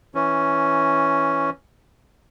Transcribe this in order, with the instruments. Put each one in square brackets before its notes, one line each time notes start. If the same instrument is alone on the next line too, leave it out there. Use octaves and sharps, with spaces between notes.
[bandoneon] E3 C#4